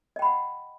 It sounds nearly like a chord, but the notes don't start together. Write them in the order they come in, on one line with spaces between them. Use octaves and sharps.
D#5 G5 B5 F#5